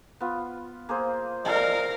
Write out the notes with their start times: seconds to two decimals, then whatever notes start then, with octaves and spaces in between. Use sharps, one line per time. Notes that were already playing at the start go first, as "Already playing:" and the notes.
0.20 B3 F4
0.89 A#3 G#4 C5
1.45 A#4 D5 D#5 F5